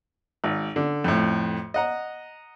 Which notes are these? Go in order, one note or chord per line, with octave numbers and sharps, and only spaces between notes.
G#1
D3
F2 A2
D#5 F#5 A#5